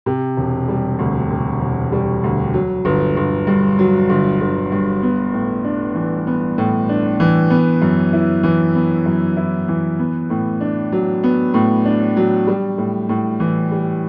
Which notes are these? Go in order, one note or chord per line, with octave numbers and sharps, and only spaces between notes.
C3
E1
G3
D2
C3
E1
G3
D2
F#3
G1
G1
G2
F#3
G1
G1
G2
B3
A2
D4
E3
B3
A2
D4
E3
B3
F#2
E4
E3
B3
F#2
E4
E3
B3
A2
D4
F#3
B3
A2
D4
F#3
G3
A2
A2
E3
G3